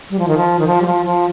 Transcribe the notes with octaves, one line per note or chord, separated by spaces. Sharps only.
G3
F3
D#3
F3
D#3
F3
G3
F3
F3